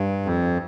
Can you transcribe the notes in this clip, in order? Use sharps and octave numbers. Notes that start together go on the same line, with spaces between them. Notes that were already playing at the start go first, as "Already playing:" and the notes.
Already playing: G2
F2